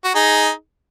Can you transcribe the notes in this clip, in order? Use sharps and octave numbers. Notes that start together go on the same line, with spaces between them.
F#4
D#4 G#4